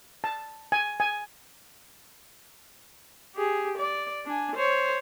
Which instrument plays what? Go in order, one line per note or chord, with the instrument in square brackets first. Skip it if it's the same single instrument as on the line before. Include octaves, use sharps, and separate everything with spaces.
[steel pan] A5
G#5
G#5
[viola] G4 G#4
D5
D4 G#5
C5 C#5